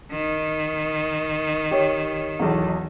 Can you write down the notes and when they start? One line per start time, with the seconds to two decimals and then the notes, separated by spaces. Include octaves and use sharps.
0.11 D#3
1.71 G4 C#5
2.39 B1 E2